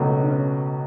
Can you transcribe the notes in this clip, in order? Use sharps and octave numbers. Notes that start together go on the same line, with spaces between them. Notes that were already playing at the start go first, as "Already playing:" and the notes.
Already playing: C#2 B2 F#3 A3 C#4
D4
C#4